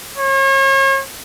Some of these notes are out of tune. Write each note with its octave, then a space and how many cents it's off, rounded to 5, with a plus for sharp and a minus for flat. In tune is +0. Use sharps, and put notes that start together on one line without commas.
C#5 -40